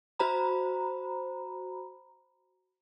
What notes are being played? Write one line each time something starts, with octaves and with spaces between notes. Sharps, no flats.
F#4 C5 A#5 B5